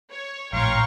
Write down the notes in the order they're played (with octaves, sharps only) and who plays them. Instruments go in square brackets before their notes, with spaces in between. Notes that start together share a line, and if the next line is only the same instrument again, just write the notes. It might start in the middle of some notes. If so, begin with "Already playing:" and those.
[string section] C#5
[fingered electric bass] A#1 A2 [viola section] C#5 G5 [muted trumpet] F5 [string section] A#5 C6 C#6